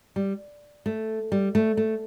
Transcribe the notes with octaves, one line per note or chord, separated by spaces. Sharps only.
G3
A3
G3
A3
A3